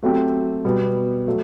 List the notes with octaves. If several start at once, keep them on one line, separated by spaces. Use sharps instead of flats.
F#3 A3 C4 G4
B2 G3 B3
F#3 A3